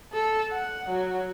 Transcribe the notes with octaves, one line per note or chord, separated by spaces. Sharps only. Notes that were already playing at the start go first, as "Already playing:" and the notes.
A4
F#5
F#3